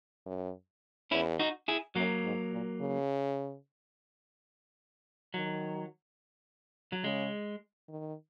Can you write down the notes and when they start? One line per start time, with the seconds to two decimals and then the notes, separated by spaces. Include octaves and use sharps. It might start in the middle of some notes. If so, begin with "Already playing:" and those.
0.26 F#2
1.11 E2 C#4 E4
1.40 D#4 F#4
1.68 E4 G#4
1.95 F#2 F#3 A#3
2.24 G#2
2.52 A#2
2.80 C#3
5.34 D#3 F#3
6.92 F#3
7.04 C#3 G#3
7.89 D#3